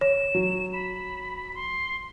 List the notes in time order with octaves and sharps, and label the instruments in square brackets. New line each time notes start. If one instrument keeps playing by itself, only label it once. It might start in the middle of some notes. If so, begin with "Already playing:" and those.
[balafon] C#5 [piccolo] E7
[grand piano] F#3
[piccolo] B5
C6